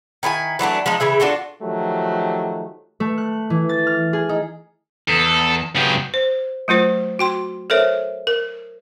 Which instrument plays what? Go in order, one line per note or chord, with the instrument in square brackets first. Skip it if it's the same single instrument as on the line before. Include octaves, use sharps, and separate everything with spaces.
[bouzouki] D#3 E4 A#4 G#5
E3 F#3 A3 D4
F3 G#3 D4 D#4
C#3 E3 G#4 E5
D4 F4 F#4 A4
[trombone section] D#3 F3 F#3 A3 G4
[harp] A3
F#6
E3
A6
F6
G#4
D#4
[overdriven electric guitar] E2 [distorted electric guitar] A4
[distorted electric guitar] F#2 C#3 [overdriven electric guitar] B3 G4
[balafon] C5
F#3 A3 F4 C5
F#4 G5 C6
A4 A#4 C5 C#5 E5
A#4